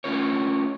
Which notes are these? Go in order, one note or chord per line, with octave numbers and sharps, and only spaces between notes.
A3 C#4 F4 A#4 C#5